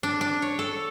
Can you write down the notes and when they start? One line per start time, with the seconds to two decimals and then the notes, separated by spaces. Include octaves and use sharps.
0.03 D4
0.21 D4
0.42 C#5
0.59 A4